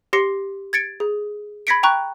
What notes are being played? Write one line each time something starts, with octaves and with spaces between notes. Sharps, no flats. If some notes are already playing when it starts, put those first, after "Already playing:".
G4 C6 A#6 C7 C#7
G#6 A6 C#7 D7
G#4
B5 G#6 A#6 B6 C#7 D7
G5 A#5 C#6 F#6